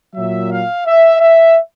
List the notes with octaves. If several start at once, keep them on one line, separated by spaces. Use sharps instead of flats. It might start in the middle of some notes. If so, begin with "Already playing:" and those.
A#2 F#3 E5
F5
E5
E5